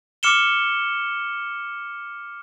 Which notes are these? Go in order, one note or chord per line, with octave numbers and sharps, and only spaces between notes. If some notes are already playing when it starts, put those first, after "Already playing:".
D6 F6 C#7 E7 G7